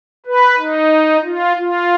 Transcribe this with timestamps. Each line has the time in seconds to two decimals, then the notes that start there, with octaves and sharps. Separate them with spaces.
0.26 B4
0.59 D#4
1.23 F4
1.56 F4